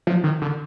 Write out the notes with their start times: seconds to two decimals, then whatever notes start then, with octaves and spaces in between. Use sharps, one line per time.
0.07 F3
0.24 D#3
0.42 D3